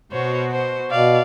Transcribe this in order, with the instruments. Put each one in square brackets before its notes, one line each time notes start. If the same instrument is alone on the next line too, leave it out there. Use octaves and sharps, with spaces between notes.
[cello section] B2 F#4 [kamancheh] C5 C#5
[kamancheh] C5
[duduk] B2 [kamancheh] D5 F5